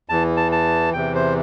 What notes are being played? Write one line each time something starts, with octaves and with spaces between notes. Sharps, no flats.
E2 E3 A5
A5
A5
E2 C3 E3 G5
C5